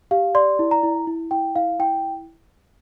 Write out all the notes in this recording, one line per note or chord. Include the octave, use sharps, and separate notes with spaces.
G4 F5
D5 C6
E4
A#5
E4
E4
E4 G5
E4 F5
E4 G5